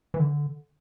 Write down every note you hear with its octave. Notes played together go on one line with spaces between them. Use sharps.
E3
D3